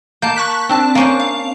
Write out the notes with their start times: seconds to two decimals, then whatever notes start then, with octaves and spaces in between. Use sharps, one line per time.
0.22 A#3 A5 G6
0.36 C#6 F#6 B6
0.69 C4 D4 A5
0.95 A#3 C#4 C5
1.20 F5